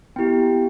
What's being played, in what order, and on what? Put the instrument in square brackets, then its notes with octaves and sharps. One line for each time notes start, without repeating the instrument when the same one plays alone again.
[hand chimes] B3 E4 G4 G5